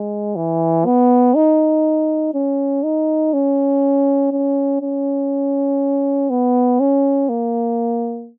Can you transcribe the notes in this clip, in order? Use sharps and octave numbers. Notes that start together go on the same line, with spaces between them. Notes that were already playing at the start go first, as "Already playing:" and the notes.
Already playing: G#3
E3
B3
D#4
C#4
D#4
C#4
C#4
C#4
B3
C#4
A#3